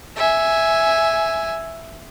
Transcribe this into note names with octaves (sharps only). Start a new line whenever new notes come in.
E5 G#5